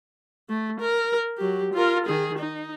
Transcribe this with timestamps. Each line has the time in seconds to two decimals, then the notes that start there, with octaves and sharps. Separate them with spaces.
0.49 A3
0.80 A#4
1.38 F#3 G4
1.74 F4 A#4
2.06 D#3 G#4
2.39 D#4